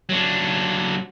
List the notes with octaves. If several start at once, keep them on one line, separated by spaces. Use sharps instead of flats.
F#3 D4